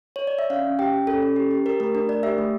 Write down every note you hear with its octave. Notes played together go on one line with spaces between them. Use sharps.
C#5
D5
E5
C#4 F5
C#4
G4 G5
G4
C#4 A4
C#4
G4
G4
G4 A#4
A3 A#4
D4 A#4
A3 D5
G4 E5
A3